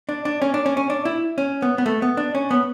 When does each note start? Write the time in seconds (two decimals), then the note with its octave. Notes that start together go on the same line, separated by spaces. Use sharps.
0.09 D4
0.25 D4
0.42 C#4
0.54 D4
0.66 C#4
0.77 C#4
0.90 D4
1.05 E4
1.38 C#4
1.62 B3
1.78 B3
1.86 A3
2.02 B3
2.17 D4
2.35 C#4
2.51 B3